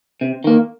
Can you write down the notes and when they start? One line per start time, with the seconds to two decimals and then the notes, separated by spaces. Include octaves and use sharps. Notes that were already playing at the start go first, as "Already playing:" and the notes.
0.21 C3
0.44 D#3 A#3